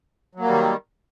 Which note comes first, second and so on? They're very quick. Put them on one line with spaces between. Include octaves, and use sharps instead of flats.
F#3 A#3 G3 D#3